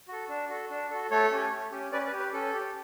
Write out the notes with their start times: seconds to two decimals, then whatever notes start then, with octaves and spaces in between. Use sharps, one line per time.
0.08 F#4 A4
0.29 D4
0.49 F#4 A4
0.70 D4
0.91 F#4 A4
1.10 A3 A4 C#5
1.32 C#4 G4
1.52 A3
1.71 C#4 G4
1.92 C#4 B4 D5
2.06 B4
2.12 G4
2.19 B4
2.33 C#4 A4
2.54 G4